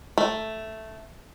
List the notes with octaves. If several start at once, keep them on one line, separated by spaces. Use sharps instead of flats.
A3